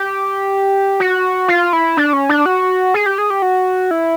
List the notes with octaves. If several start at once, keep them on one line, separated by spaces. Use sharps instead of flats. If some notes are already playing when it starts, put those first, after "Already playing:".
Already playing: G4
F#4
F4
E4
D4
C#4
D4
F#4
G#4
G4
G#4
G4
F#4
E4